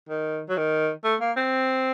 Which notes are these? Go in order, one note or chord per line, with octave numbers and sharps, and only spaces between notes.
D#3
F#3
D#3
A3
A#3
C4